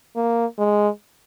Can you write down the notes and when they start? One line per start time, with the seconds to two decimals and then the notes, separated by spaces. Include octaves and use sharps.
0.16 A#3
0.59 G#3